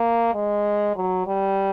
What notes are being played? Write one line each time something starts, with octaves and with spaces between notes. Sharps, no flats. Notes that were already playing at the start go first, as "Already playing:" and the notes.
Already playing: A#3
G#3
F#3
G3